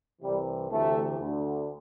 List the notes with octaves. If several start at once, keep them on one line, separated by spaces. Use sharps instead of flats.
C2 C3 E3 G3
D2 C3 E3 A3
D2 D3